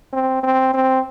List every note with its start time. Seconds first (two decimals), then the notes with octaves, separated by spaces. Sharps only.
0.13 C4
0.43 C4
0.74 C4